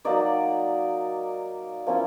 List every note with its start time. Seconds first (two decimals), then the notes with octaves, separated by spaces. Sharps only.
0.05 F#3 A#3 D#4 D5
1.87 F3 A#3 C#4 E4